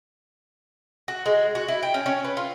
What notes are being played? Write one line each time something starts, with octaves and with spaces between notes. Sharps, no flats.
F#4
G#3
F#4
E4
G5
C#4
C#4
B4
F4